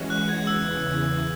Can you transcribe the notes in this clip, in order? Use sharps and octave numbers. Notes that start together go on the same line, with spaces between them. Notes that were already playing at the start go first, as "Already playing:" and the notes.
Already playing: E3 G#3 C#4 F#4
F#6
G#6
E2 C#3 E3 E6